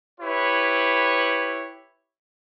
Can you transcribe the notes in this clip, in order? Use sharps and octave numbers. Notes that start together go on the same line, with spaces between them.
E4 G4 B4 C#5